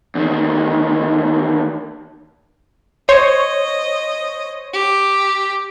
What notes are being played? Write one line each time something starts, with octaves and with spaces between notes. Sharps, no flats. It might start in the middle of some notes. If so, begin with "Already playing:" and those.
E2 D#3
C5 C#5 D#5
G4